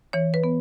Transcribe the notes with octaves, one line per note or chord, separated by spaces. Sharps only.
E3 C#5
B4
B3